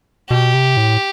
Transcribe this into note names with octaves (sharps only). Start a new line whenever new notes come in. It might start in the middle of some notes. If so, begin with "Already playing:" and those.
B2 G4
C3
A2